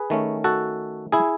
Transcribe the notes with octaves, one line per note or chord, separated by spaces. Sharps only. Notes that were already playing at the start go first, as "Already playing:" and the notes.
Already playing: G#4 B4
D#3 A3 C#4
F#4 A4
E4 G#4